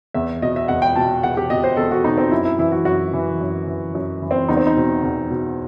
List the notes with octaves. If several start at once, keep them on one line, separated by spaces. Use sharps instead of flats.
E2 E5
B2 D#5
E5
E2 F#5
G5
B2 A5
E2 F#5
G4
B2 D#5
C5
E2 A4
F#4
B2 D#4
C4
F#2 E4
E4
E3 E4
F#4
F#2 F#4
E3
F#2
E3
F#2
E3
C4
E2 D#4
C4
D#4
B2
E2
B2